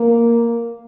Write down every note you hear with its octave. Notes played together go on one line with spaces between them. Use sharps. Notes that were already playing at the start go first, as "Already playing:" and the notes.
Already playing: A#3